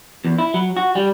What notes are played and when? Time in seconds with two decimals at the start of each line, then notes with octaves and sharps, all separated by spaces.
0.25 E2
0.39 E4
0.54 F#3
0.77 F#4
0.95 G3